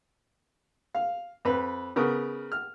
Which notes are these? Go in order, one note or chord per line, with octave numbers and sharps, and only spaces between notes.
F5
F2 B4
C#3 B3 A#4
F6